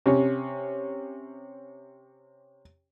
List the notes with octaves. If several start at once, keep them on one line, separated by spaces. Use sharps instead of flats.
C3 C#4